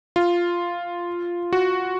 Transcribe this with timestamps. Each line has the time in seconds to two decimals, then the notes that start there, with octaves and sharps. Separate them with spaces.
0.16 F4
1.53 F#4